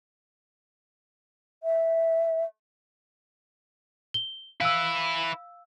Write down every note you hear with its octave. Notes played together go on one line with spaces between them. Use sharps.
E5
G7
E4 B4 F5 E6